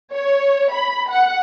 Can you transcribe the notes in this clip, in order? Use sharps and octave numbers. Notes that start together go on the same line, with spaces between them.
C#5
B5
F#5